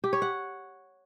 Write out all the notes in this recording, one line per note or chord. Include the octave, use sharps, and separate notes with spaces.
G4
C#5
F#5